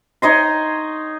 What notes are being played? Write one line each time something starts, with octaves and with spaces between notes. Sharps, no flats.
D#4 C#5 D#5 C6